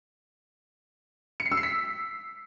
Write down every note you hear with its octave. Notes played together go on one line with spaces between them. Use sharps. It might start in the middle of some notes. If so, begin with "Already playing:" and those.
C#7
C7
E6
C7
B6